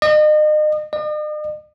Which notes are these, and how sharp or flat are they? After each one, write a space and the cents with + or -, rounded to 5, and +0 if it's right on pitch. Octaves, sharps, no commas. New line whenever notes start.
D#5 -35
D#5 -45